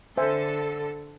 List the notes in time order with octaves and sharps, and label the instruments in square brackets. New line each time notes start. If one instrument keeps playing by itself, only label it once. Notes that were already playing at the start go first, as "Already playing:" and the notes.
[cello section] D3 A4 [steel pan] C5 E5 G#5